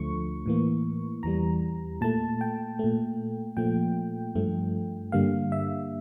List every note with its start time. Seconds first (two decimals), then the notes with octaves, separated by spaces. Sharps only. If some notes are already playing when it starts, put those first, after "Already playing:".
Already playing: D2 D3 F3 A3 C#6
0.46 A2 E3 A#3
1.23 E2 E3 G3 A#5
2.01 A#2 A3 A5
2.41 G5
2.79 A#2 A3
3.57 A#2 F3 A3 G5
4.35 G2 F3 A3
5.12 G2 D3 G3 A#3 F5
5.52 E5